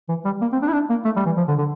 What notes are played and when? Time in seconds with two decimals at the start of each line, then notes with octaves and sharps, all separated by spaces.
0.09 E3
0.25 G3
0.41 A#3
0.53 C4
0.62 D4
0.69 E4
0.73 D4
0.90 A#3
1.05 A3
1.16 G3
1.26 E3
1.37 F3
1.48 D3
1.59 D3